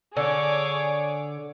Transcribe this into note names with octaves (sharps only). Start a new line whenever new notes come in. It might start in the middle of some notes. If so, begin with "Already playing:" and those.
D3 G#4 C#5 D6